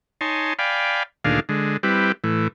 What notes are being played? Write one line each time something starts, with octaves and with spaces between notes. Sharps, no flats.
D#4 C#5 G#5 A5 C6
D5 F5 G5 G#5 B5
D2 A#2 D#3 D4 G#4 F5
D3 G#3
G3 C4 E4 G4 B4
A2 E3